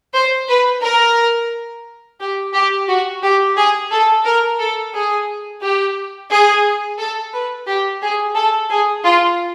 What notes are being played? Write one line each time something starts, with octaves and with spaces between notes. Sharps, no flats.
C5
B4
A#4
G4
G4
F#4
G4
G#4
A4
A#4
A4
G#4
G4
G#4
A4
B4
G4
G#4
A4
G#4
F4